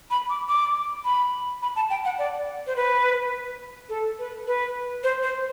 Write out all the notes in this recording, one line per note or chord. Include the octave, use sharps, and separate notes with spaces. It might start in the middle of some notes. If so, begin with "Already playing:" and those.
B5
D6
D6
B5
B5
A5
G5
F#5
D5
C5
B4
A4
B4
B4
C5
C5